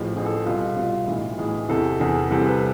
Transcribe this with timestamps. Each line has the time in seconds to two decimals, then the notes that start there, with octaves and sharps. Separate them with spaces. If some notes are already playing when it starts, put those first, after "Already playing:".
Already playing: A1 A2 F3 G#4
0.15 A1 A2 F3 G#4
0.26 A4
0.35 G#4
0.45 C2 B2 F4
0.77 C2 B2 F4
1.07 B1 A2 E3 E4
1.38 B1 A2 E3 G#4
1.69 E2 C3 E3 A4
1.99 E2 C3 E3 G#4
2.30 C2 C3 E3 A4
2.46 B4